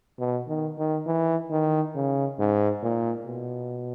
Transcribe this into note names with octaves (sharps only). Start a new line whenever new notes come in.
B2
D#3
D#3
E3
D#3
C#3
G#2
A#2
B2